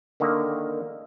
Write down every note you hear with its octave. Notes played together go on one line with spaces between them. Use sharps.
D3 D#3 A#3